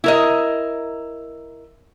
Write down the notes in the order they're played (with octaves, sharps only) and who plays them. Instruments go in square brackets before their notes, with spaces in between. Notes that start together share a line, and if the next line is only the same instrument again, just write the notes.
[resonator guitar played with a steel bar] E4 A#4 D#5